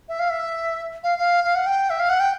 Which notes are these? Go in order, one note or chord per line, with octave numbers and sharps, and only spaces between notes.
E5
F5
E5
F5
F5
F5
F#5
G5
E5
F5
F#5
G5